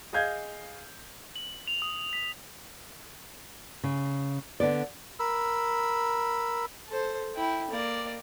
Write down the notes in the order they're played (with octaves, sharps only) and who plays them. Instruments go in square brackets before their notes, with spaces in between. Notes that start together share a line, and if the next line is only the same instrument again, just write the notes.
[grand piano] G#4 D#5 F5 G6 G#6
[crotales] F#7
F7
D#6
B6
[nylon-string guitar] C#3
D3 B3 D5
[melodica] A#4 B5 E6
[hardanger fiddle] A4 C5
E4 G5
A#3 D5